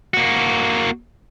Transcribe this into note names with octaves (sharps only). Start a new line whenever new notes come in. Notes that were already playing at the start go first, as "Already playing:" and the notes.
A#3 F#4